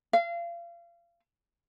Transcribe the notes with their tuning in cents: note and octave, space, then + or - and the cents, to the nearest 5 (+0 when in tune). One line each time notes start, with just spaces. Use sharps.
F5 -30